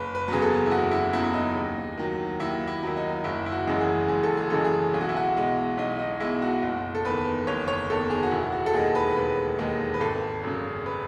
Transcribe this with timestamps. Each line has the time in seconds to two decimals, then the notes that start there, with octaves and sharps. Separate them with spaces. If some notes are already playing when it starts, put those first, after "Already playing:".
Already playing: F#1 B4
0.15 B4
0.28 E2 C#3 F#3 G#4
0.42 A4
0.66 E4
0.71 F#1 F#4
0.91 E4
1.13 E2 C#3 F#3 E4
1.24 E4
1.34 D#4
1.55 D#2
1.98 D#3 F#3
2.40 D#2 E4
2.67 E4
2.83 D#3 F#3 E4
2.96 D#4
3.24 F#1 E4
3.46 E4
3.52 F#4
3.67 F#2 C#3 E3 G#3
3.80 G#4
4.08 F#1 G#4
4.23 A4
4.37 G#4
4.50 F#2 C#3 E3 G#3 A4
4.64 G#4
4.94 B1 G#4
5.01 F#4
5.09 E4
5.16 F#4
5.36 B2 G#3
5.77 B1 D#4
5.99 D#4
6.20 B2 G#3 E4
6.42 F#4
6.62 F#1
6.95 A4
7.05 E2 D#3 B4
7.47 F#1 C#5
7.68 C#5
7.90 E2 D#3 A4
8.10 G#4
8.23 F#4
8.31 E1 E4
8.52 F#4
8.66 A4
8.73 D#2 D#3 G#3 G#4
8.95 B4
9.16 E1 B4
9.58 D#2 D#3 G#3
9.94 B4
10.00 G#1 A4
10.44 F#2 C#3
10.86 B4